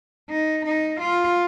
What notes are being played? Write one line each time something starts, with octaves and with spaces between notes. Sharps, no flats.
D#4
D#4
F4